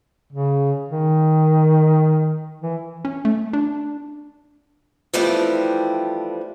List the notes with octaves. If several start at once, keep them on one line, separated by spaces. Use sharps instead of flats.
C#3
D#3
E3
C#4
A3
D4
E3 F3 G3 A3 C4 D4